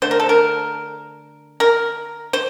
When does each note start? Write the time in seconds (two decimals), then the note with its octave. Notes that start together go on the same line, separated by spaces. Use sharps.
0.02 D3 A3 C5
0.11 A#4
0.20 A4
0.29 A#4
1.60 A#4
2.33 C5